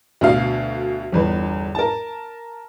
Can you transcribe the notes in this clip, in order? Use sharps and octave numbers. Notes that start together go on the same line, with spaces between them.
D2 B2 F5
G1 E2 B4
A#4 A5